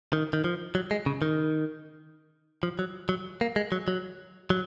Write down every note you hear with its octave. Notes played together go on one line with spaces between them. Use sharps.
D#3
D#3
F3
F#3
G#3
C#3
D#3
F3
F#3
F#3
A#3
G#3
F#3
F#3
F#3